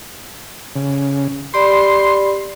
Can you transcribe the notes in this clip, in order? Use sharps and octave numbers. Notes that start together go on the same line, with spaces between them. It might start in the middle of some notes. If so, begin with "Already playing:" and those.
C#3
G4 D5 B5 C6